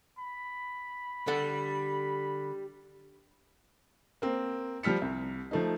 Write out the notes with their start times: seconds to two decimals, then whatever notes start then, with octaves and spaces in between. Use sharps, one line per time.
0.18 B5
1.27 D3 G3 A4 F#5
4.22 A#3 C4
4.83 F3 G3 F6 B6 C#7
5.02 C2
5.51 F3 A3 D#4